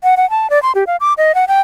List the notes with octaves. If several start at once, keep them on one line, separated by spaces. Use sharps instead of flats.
F#5
F#5
A5
D5
C6
G4
F5
D6
D#5
F#5
G5